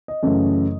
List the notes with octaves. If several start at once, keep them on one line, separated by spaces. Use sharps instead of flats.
D#5
F#2 C#3 E3 A3 C#4